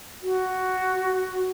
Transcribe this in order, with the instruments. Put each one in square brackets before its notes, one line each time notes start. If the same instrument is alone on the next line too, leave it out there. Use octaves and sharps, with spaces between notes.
[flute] F#4